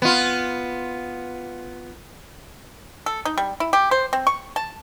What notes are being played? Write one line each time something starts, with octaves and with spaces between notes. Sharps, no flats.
B3 F4
A4
D#4
G3
E4
G4
C5
C4
C#6
A5